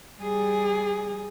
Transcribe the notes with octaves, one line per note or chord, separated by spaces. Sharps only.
G3 G#4